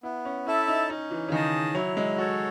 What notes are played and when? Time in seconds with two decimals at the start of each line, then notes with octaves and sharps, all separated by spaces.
0.03 B3 E4
0.25 C#4
0.47 C#4 E4 A4 E5 A5
0.68 D#4
0.90 C#4 D#4
1.11 E3
1.28 C#3
1.32 D#3 G#4 D#5 A5
1.74 F#3 E4
1.97 G#3
2.18 F#4 A4 C#5